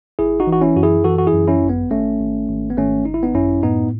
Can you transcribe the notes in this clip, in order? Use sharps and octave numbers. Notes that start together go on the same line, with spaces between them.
G#1 E4 G#4
D#4 F#4
E3
F#4
C#4 E4
F#2 F#4
E4 G#4
E3 F#4 A4
F#4
E4 G#4
F#2
C#4 E4
G#1
B3
G#1 A3 C#4
G#1
G#1
B3
G#1 A3 C#4
G#1 D#4
E4
B3 D#4
F#2 C#4 E4
A2 B3 D#4